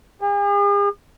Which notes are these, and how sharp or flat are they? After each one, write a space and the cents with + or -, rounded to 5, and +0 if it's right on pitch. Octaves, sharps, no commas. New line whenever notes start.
G#4 -45